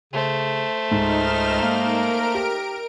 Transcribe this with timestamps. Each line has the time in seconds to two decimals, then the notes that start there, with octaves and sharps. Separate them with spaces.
0.13 C#3 A3 C5
0.91 C#2 G#2 D#4 F6 E7
1.62 A#3 A#4 D7
2.35 G4